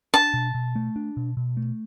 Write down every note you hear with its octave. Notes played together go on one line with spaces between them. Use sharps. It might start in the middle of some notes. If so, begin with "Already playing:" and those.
D4 A5
B2
B2
A3
D4
B2
B2
A3